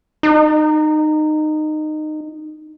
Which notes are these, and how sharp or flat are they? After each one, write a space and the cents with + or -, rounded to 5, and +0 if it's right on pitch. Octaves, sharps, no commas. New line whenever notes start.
D#4 -20